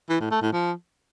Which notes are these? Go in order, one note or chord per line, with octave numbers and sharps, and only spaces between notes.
E3
A2
A3
A2
F3